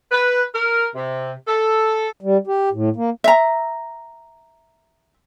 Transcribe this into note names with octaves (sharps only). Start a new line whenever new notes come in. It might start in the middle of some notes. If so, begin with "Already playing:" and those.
B4
A#4
C3
A4
G3
G4
A2
A#3
E5 A#5